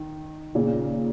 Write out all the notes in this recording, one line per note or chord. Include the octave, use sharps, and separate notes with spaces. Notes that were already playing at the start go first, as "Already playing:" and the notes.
Already playing: D#3
A#2 C#3